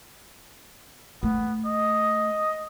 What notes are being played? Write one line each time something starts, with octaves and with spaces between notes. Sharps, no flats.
A3 B3
D#5